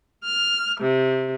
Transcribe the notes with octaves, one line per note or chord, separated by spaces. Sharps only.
F6
C3